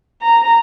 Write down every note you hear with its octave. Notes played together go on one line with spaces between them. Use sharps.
A#5